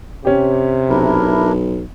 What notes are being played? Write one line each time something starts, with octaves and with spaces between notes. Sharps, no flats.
C3 C#4 G4
B1 D4 E4 A#4